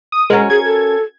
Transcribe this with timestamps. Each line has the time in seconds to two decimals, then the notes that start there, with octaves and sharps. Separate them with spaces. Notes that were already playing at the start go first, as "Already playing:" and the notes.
0.12 D#6
0.30 G#3 C#4 F#4 A#4
0.50 G#4 G#6
0.65 A4